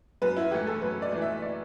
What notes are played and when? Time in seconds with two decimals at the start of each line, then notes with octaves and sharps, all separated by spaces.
0.22 F#2 B4
0.37 E4
0.51 E3 A3 G4
0.67 A4
0.82 F#2 B4
1.02 D5
1.12 E3 A3
1.22 E5
1.42 D5